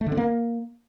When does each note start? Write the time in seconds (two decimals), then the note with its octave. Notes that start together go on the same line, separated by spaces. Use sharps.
0.01 A3
0.06 D3
0.12 C4
0.17 A#3